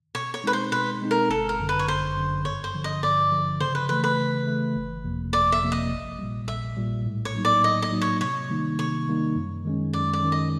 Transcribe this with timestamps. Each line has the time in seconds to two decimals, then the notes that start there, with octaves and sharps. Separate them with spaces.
0.15 B2 C#5
0.34 C#5
0.44 G#3 C4 D#4 B4
0.53 C5
0.72 B2 B4
1.02 G#3 C4 D#4
1.11 A#4
1.30 G1 A4
1.49 A#4
1.59 F#2 D3
1.69 B4
1.79 C#5
1.88 G1 C5
2.17 F#2 D3
2.45 G2 C#5
2.64 C5
2.74 D3 F3
2.84 D#5
3.03 G2 D5
3.31 D3 F3
3.60 C#3 C5
3.75 B4
3.89 E3 A3 B4
4.04 B4
4.17 C#3
4.47 E3 A3
4.76 G1
5.04 F2 C3 F3 A#3
5.33 G1 D5
5.52 E5
5.61 F2 C3 F3 A#3
5.72 D#5
5.91 A#1
6.19 A#2 G3
6.48 A#1 E5
6.77 A#2 G3
7.05 A2
7.25 C#5
7.35 F#3 A#3 D#4
7.45 D5
7.64 A2 D#5
7.82 D#5
7.92 F#3 A#3 D#4
8.02 C#5
8.21 C3 C#5
8.50 D#3 G3 A#3 D#4
8.79 C3 C#5
9.08 D#3 G3 A#3 D#4
9.36 F#2
9.65 D#3 G#3 C#4
9.93 F#2 D5
10.13 D5
10.23 D#3 G#3 C#4
10.32 D#5